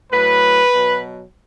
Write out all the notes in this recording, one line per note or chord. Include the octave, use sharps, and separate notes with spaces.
A2 F#3 B4
B2 F#3